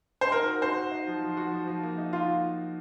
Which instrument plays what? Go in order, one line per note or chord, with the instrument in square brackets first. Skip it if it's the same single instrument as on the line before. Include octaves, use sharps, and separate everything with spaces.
[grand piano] C5
[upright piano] D#4 [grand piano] A#4
[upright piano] F#4
[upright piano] F#4 [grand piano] C5
[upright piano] F#4
D#4
F3
F3
F#4
F3
F3
A#3
D#4
[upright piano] A#3 [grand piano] F4